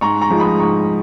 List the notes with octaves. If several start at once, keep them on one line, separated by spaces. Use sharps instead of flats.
G#2 A#5 C#6
A#5 C#6
F3 G#3 D#4
B5 D#6
G#2 A#5 C#6